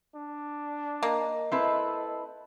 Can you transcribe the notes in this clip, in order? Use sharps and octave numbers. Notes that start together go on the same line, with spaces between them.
D4
A#3 D#5
C4 E4 A4 B4